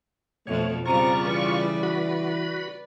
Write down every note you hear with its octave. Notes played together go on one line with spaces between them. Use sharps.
F2 B2 F3 A3 C#5
C#3 G3 C4 F4 A#5 C#6
E3 B4 D5
F#4 B5